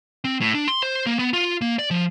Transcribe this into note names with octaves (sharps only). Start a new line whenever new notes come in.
C4
A2
D4
C6
C5
A#3
B3
F4
A#3
D5
F3